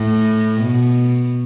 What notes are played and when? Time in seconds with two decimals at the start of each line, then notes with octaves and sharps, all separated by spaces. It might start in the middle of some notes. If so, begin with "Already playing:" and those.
Already playing: A2
0.63 B2